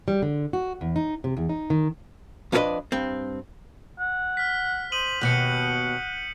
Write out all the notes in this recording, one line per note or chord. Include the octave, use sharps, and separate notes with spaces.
G3
D3
F#4
E2
D#4
C3
E2
D#4
D#3
F2 C#4 D4 F4 B4 D#5
G2 C4
F#5
F6 B6
C5 D#6 D#7 F#7
D#2 B2 F#5 G6 C#7